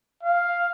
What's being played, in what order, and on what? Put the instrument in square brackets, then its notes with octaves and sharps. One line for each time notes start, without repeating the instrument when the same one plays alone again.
[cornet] F5